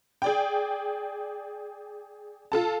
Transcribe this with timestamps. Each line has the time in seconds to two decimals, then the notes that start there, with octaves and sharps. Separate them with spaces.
0.22 G#4 D5 G5
2.52 F4 A4 A5